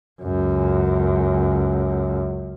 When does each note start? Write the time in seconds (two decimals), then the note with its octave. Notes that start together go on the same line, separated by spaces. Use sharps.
0.22 C#2 F#2